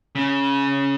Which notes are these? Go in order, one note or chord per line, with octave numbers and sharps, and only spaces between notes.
C#3